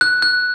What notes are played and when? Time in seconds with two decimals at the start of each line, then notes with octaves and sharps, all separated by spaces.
0.01 F#6
0.22 F#6